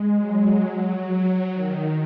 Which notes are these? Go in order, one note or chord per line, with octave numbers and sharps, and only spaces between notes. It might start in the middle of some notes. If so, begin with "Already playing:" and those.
Already playing: G#3
F#3
F#3
D#3